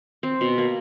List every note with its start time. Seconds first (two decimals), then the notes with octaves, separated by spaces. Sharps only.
0.23 C4
0.41 B2
0.58 A#3